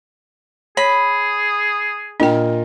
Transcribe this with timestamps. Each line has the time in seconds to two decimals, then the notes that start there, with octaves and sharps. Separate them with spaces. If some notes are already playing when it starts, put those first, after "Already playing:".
0.77 G#4 C#5 B5
2.20 A#2 D4 A#4 D#5 G5